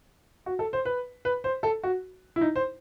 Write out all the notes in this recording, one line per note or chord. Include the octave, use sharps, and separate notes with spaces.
F#4
A4
C5
B4
B4
C5
A4
F#4
E4
D#4
C5